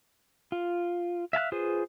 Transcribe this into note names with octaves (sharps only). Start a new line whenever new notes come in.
F4
E5 F5 A5 F#6
F4 G#4 B4 C5